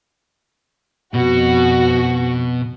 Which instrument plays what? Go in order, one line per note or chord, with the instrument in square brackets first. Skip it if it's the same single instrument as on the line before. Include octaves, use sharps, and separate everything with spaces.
[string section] F2 F#4 [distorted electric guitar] B2